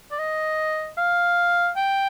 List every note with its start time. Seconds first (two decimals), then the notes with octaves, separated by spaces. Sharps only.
0.11 D5
0.19 D#5
0.97 F5
1.77 G5